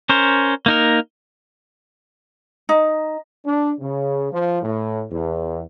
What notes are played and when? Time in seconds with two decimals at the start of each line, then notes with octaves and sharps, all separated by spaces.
0.09 C#4 A#4 C5
0.66 A#3 D#4 A#4
2.69 D#4
3.45 D4
3.81 C#3
4.32 F3
4.63 A2
5.11 E2